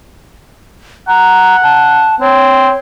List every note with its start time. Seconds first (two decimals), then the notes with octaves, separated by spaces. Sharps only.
1.08 F#5 A#5
1.63 A5
2.21 C4 C#5